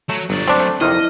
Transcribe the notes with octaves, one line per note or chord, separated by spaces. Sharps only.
F#3 A3
G1 F#3 D5
C4 D4
A3
F2 C3 D#3 E4 D#5 F6